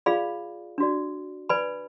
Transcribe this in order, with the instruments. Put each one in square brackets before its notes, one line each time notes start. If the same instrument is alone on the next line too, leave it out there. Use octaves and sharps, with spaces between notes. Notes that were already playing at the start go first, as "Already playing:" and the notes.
[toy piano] F4 G#4 D5 F5 B5
D4 F#4 D5
B4 D5 G#5 B5